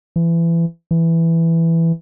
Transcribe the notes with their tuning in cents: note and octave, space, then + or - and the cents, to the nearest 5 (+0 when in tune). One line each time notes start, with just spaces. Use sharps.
E3 +25
E3 +5